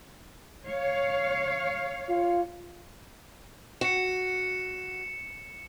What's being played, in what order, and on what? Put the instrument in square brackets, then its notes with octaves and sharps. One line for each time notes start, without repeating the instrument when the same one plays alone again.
[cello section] C#5 F5
[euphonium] F4
[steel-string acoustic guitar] F#4 [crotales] C#7 E7